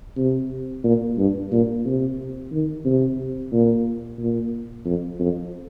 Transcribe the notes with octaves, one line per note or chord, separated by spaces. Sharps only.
C3
A#2
G2
A#2
C3
D#3
C3
A#2
A#2
F2
F2